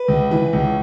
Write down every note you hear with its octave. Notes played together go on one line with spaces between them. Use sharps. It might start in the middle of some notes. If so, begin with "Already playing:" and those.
Already playing: B4
C#2
E3
C#2